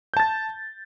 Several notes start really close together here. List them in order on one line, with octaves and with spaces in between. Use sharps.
G6 A5 A6